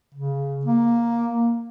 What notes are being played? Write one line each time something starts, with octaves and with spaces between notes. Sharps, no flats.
C#3
A#3